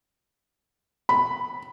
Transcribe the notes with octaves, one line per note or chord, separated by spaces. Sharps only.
B5